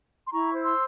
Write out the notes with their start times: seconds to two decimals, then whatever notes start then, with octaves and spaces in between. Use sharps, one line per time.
0.24 C6
0.32 E4 A#5 C#6
0.55 C5
0.62 C6 E6